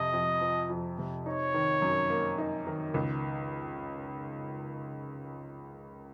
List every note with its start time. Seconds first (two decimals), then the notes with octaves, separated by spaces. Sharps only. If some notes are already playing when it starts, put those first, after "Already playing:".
Already playing: F2 C3 D#5
0.13 F2
0.41 F3
0.70 F2
0.98 C3
1.25 D#4 C#5
1.54 D#3
1.82 F#2
2.10 A#3
2.38 D#4
2.67 D#3
2.94 C#2